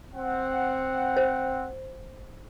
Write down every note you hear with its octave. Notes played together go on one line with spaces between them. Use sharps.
C4 F#5
C5